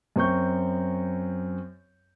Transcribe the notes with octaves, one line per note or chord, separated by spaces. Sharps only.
F#2 C4 C#6 G6